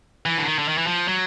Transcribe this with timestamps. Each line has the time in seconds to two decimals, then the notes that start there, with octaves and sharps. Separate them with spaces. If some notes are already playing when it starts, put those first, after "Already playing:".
0.26 E3
0.38 D3
0.46 D#3
0.59 D3
0.69 D#3
0.78 E3
0.87 F3
1.08 F#3